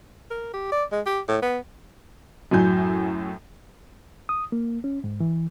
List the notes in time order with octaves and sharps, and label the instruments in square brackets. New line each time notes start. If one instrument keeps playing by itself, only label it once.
[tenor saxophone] A#4
G4
D5
G#3
G4
A2
B3
[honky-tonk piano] F#2 A2 F#3 G#5 G6
[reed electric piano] D#6
A#3
C#4
G#2
E3